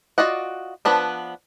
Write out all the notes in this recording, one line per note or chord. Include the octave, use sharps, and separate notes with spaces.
F4 F#4 D5 D#5 F#5
F3 B3 D4 B4